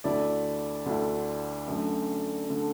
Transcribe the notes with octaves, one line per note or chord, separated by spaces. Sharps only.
D2 D3 A3 E4 D5
D2 D3 A3 E4
F#2 D3 A3
D3 A3